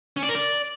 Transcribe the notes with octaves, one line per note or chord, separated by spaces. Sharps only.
C#4
D5
A#4
D5